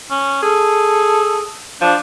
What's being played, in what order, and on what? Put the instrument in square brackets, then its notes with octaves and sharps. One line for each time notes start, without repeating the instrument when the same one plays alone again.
[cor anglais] C#4
[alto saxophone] G#4 [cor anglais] A4
[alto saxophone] F3 [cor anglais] D4